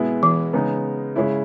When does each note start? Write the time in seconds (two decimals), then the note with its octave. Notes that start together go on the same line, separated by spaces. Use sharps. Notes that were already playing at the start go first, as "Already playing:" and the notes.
Already playing: B2 G#3 B3 E4 G#4
0.23 E3
0.53 C#3 G#3 B3 D#4
1.16 C#3 G#3 C#4 E4